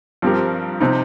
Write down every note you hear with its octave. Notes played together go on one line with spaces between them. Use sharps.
G2 F3 C4 G4 A#4
C3 F3 C4 D#4